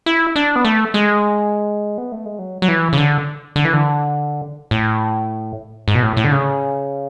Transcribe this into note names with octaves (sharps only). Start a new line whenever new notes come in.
E4
D4
B3
A3
G#3
B3
A3
G#3
F#3
F#3
E3
C#3
D3
D3
E3
D3
A2
G#2
B2
A2
A2
D3
C#3